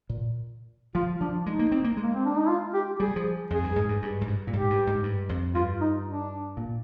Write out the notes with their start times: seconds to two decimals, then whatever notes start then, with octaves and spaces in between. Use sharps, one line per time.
0.09 A#2
0.95 F3 F4
1.21 F3 D4
1.46 G#3 D#4
1.59 A#3
1.72 C4
1.84 A#3
1.97 G#3
2.03 A#3
2.14 C4
2.25 D4
2.37 D#4
2.48 F4
2.74 G4
3.00 G3 G#4
3.16 F3
3.50 F2 G#4
3.63 G2
3.76 G#2
3.89 G2
4.02 G2
4.21 G#2
4.27 G2
4.47 A#2
4.53 G#2 G4
4.70 G2
4.87 G#2
5.03 G2
5.29 F2
5.54 G2 F4
5.81 D#4
6.06 D4
6.57 A#2